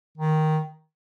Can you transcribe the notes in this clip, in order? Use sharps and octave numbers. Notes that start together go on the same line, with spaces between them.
D#3